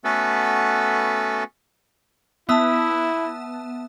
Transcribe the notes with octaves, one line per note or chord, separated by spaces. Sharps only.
A3 B3 C#4 F#4 A4 B4
B3 E4 E5 A5 D#6 E6